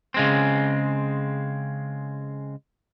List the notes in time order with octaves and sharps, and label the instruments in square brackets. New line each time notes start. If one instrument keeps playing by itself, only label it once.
[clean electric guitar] C#3 G#3 C4